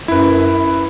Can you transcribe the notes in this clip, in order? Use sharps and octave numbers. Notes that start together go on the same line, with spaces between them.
F#2 E4 B4